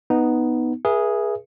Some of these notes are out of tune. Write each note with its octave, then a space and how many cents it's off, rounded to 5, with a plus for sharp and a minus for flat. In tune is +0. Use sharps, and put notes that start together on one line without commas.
B3 +0 D#4 +0
G#4 +0 B4 -45 E5 +15